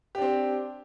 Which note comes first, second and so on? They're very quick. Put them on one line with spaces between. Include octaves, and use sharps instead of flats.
G4 D4 C4